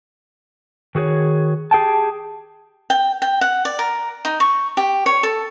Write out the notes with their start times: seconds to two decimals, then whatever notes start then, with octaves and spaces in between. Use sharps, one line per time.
0.95 D#3 F#4 G#4 B4 C#5
1.71 G4 G#4 G5 A5
2.90 G5
3.22 G5
3.41 F#5
3.65 D5
3.79 A#4
4.25 D#4
4.40 C#6
4.77 G4
5.06 C#5
5.23 A4